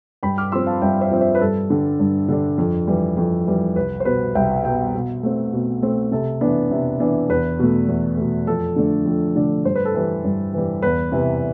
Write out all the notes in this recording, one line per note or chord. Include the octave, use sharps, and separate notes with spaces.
G2 G5 B5
D6 F6
F3 C4 C6 E6
F5 A5
G2 E5 G5
C5 E5
F3 C4
C5 E5
B4
G2 A4
D3 G3 D4
G2
D3 G3 D4
F2
E3 G3
F2
E3 G3
C2 B4
C5
B2 B3 B4
C2 E5 G5
B2 B3 E5 G5
B2
A3 C4
B2
A3 C4
C3 A4
E3 B3 D4
C3
E3 B3 D4
E2 B4
B2 A3
E2
B2 A3
F2 A4
D3 A3 D4
F2
D3 A3 D4
G2 C5
B4
A4
E3 G3 B4
G2
E3 G3
E2 B4
C3 E3